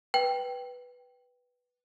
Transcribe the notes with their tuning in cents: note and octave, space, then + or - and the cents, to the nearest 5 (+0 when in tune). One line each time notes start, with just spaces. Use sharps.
B4 +0 G5 +0